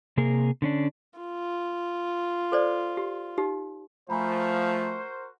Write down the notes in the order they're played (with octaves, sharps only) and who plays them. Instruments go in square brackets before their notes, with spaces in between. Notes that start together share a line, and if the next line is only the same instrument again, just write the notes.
[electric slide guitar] C3 A#3 G#4 A#4
D3 C#4 D4
[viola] F4
[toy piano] A4 C5 D5
G4
D#4 G4
[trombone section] F3 [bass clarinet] A3 [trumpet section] F#4 A#4 C5 [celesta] G#5 A#5 B5